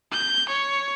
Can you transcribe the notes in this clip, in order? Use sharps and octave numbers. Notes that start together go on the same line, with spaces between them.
G6
C#5